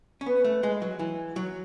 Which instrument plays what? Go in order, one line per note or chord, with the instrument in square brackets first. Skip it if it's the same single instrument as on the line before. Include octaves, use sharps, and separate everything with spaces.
[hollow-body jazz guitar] C#4
[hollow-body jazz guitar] B3 [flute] B4
[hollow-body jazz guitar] A3
G#3
F#3
E3
F#3